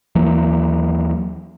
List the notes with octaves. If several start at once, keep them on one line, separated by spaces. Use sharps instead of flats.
D#2 E3 F#3 A#3